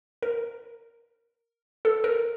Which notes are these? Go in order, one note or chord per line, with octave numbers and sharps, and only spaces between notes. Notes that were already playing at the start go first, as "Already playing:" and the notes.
A#4
A4
A#4